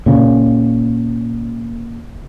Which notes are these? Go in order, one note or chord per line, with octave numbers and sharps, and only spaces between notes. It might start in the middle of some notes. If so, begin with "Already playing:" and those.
A#2 C#3